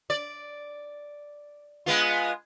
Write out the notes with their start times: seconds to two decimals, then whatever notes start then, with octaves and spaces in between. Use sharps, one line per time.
0.10 D5
1.86 G#3 B3 F4